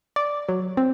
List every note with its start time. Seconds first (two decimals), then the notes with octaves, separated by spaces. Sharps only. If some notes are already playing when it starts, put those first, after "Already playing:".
0.16 D5
0.49 F#3
0.77 C4